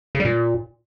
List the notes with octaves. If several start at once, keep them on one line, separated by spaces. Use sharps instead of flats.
C#3
G3
A#2